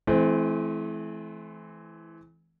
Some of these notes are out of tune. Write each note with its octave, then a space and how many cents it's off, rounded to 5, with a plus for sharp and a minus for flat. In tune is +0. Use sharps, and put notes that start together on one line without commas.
E3 +0 A3 -45 C4 -10